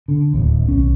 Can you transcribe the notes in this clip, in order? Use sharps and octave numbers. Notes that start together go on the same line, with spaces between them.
D3
D1 D#2
B1 C#4